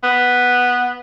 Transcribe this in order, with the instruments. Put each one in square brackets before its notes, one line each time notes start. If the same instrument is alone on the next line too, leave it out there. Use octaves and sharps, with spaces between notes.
[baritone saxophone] B3